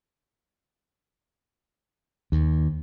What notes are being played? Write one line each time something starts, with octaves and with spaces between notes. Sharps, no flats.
D#2